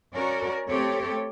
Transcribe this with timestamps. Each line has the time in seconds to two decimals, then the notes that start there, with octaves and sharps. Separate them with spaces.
0.13 C#4 F#4 A#4 D5
0.69 A3 C4 G4 A4 C#5